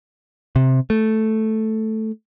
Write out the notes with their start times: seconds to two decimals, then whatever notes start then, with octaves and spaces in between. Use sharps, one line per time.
0.56 C3
0.90 A3